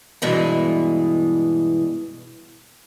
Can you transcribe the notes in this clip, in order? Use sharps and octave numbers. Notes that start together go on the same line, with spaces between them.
G2 B2 E3 G#3